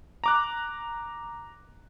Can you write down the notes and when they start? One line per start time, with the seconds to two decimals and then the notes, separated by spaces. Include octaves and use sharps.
0.24 A#5 D6 F#6